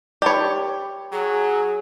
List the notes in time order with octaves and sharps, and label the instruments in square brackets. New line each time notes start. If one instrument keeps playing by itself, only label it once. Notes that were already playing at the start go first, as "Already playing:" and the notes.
[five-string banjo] G4 C#5 [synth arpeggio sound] D5 A5 B5
[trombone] F#3 [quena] G#4